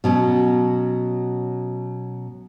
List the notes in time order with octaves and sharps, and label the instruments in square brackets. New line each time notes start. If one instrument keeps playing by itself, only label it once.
[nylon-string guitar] B2 F#3 C#4